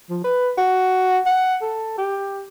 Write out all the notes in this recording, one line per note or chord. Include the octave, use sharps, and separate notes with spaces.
F3
B4
F#4
F#5
A4
G4